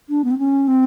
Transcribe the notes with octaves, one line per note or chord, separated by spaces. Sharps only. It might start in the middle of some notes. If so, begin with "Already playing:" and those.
D4
B3
C4
C#4
C4